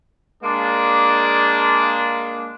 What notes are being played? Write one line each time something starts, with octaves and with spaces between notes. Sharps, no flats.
G#3 A#3 D4